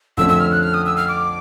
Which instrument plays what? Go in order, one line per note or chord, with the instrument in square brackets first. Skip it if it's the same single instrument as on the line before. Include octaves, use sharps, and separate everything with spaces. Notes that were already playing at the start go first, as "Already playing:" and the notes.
[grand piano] F2 D3 F3 A3 C#4 [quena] E6
[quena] E6
F6
F#6
F6
D#6
E6
F6
D6